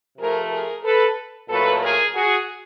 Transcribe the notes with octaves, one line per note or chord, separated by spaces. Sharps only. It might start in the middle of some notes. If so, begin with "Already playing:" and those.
C3 F3 A3 G#4 A#4
G#4 A#4
A4 B4
A#2 F#3 A3 A4 B4
G#4 A#4
F#4 G#4